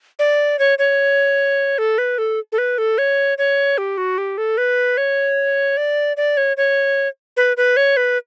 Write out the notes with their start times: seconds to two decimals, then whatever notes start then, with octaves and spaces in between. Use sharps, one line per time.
0.19 D5
0.59 C#5
0.79 C#5
1.78 A4
1.98 B4
2.18 A4
2.52 A4
2.58 B4
2.78 A4
2.98 C#5
3.38 C#5
3.78 G4
3.98 F#4
4.18 G4
4.38 A4
4.58 B4
4.97 C#5
5.77 D5
6.17 D5
6.37 C#5
6.57 C#5
7.37 B4
7.57 B4
7.77 C#5
7.97 B4